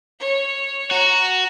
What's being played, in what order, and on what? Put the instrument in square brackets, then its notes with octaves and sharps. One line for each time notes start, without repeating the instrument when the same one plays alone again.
[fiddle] C#5
[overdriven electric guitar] F#4 [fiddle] A#5